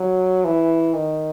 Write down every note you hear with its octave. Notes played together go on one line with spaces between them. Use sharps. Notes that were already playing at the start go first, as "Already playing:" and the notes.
Already playing: F#3
E3
D#3